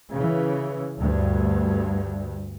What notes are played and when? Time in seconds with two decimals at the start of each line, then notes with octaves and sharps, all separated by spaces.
0.13 C#3 E3
0.98 D2 G2